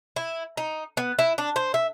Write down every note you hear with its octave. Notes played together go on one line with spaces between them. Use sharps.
E4
D#4
B3
E4
D4
C5
E5